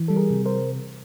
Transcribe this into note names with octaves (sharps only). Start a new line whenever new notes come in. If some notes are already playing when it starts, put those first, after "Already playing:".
Already playing: E3
G3 A4
G#4 A#4
C3
A#4 C5